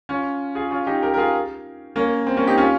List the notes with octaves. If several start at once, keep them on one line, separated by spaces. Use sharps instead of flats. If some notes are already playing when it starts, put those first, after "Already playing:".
C#4 F4
F4 G#4
C#4 F4
D#4 G4
G4 A#4
A#4
F4 G#4
A#3 C#4
C4
A#3 C#4
D#4 G4
C#4 F4